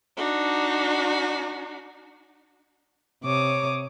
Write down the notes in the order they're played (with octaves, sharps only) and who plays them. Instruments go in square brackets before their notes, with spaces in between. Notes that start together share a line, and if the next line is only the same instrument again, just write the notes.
[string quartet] D4 D#4 F#4
C3 C#5 D6 D#6